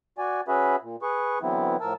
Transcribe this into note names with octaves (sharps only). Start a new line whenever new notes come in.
F#4 D5 G#5
C#4 F#4 G#4 B4 E5 B5
A#2
G#4 B4 C#6
D3 E3 F#3 B3 C4 E4
A2 F3 A#4 A5 E6